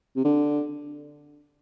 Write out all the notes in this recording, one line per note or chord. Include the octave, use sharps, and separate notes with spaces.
C3
D3